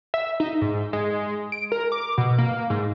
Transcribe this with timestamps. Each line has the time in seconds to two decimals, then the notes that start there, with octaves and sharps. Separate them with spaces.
0.14 E5
0.40 D#4
0.61 G#2
0.93 G#3
1.52 D7
1.72 A#4
1.92 D6
2.18 B2
2.38 A#3
2.70 G#2